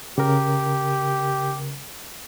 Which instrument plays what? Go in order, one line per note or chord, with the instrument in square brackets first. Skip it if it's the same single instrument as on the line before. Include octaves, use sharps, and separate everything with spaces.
[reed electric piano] C#3 A#4 [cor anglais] G4